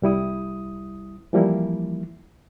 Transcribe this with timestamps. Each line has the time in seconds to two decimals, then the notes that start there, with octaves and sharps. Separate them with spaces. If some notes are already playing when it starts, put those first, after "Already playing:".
0.02 C2 G3 E4 D#6
1.33 E3 F3 G3 A#3 E4